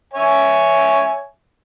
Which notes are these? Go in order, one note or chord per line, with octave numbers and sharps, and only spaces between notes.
C#5 E5 G#5